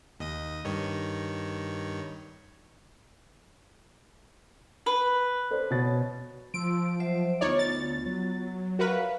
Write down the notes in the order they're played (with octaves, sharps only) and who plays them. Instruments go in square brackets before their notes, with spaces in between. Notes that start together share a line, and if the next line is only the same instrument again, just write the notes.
[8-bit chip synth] D#2 D#5 D#6
G2 D#3 C#5
[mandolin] B4
[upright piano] A4 C5 D5
B2 C#5 A6
[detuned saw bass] F3 [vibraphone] C6 E6 [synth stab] D7
[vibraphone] F#3 C5 E5
[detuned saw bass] D2 [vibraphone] B3 F4 [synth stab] D#4 C#5 D5
[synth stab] A6
[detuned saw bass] F#3
[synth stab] F#4 A#4 B4 [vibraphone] E5 F5